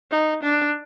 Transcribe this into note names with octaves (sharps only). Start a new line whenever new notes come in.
D#4
D4